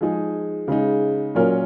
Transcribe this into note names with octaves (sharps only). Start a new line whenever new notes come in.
F3 G#3 D#4 G#4
C#3 G#3 D#4
A#2 F#3 C#4 F4 A#4